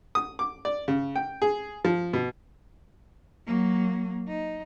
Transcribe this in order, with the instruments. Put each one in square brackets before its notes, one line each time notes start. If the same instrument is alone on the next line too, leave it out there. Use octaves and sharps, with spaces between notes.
[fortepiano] D#6
D6
D5
C#3
G5
G#4
F3
B2
[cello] F#3 A#3
D#4